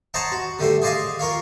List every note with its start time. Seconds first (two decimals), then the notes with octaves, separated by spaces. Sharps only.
0.14 C5 C#5 D#5 F#5 A5 A#5
0.32 F#4
0.59 D3 G3 A3 C5
0.82 G#4 C5 D5 D#5 F5 G#5
1.19 F4 A#4 C#5 F5